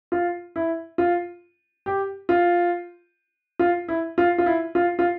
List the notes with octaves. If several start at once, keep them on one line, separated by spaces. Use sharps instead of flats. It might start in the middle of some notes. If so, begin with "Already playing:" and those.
F4
E4
F4
G4
F4
F4
E4
F4
F4
E4
F4
F4